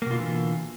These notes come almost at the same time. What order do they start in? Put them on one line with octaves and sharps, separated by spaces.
A#3 B2 F4 D3 E3